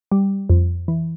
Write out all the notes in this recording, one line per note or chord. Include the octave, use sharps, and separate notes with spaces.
G3
F2
E3